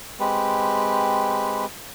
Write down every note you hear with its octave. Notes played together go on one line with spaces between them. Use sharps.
G#3 C4 G4 B4